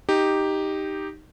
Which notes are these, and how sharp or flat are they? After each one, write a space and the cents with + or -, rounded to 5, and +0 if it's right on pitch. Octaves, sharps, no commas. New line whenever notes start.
D#4 +0 G4 +0